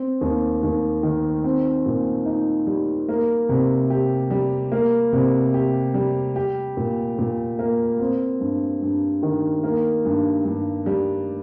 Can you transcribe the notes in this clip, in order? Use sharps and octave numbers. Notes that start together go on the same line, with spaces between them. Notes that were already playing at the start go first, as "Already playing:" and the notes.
Already playing: C4
D#2
D#2
D#3
C4
A#2
D#4
G3
A#3
C3
G4
G3
A#3
C3
G4
G3
G4
A#2
A#2
A#3
C4
G2
G2
D#3
A#3
G2
G2
G3